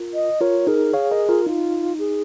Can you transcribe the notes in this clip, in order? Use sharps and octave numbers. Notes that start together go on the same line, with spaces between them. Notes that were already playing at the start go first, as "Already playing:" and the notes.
Already playing: F4 A#4
D#5
F4 A#4 C#5
D#4 G#4 A#4
G#4 C#5 F5
A#4 D#5
F4 A#4
D#4 F4
G#4